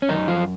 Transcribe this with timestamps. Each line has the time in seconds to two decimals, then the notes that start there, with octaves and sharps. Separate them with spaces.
0.02 C#4
0.09 F#2 D#3 D#4
0.28 F3 F4